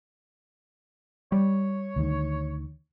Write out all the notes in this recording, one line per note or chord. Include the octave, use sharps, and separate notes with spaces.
G3 C#5
D2 D#3